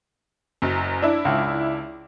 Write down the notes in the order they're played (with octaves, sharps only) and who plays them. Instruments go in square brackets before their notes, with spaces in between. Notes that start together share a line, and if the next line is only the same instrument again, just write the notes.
[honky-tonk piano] F#1 F#2
D4 E4
[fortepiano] C#2